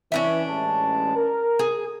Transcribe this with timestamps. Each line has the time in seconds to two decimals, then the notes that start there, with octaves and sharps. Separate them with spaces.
0.12 E3 C#4 D4 E5
0.48 A1 G#3 A5
1.16 A#4
1.59 G#4